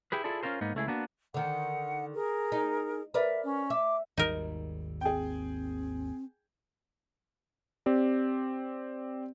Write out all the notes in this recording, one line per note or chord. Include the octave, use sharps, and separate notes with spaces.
E4 G4 G#4 B4
E4 F4 G#4 A4 D5
C#4 D#4 F4 A#4 C5
G#2 A#3 B3 D#4
C#2 A3 E4 G#4
A#3 B3 D4 F#4
D3 D#3 F#5
G#4 A#4
D#4
A#4 B4 D5 E5
C#4
E5 D6
G#1 D#2 G3 D#4 A#4
C4 G#4 G5
C4 G4 D5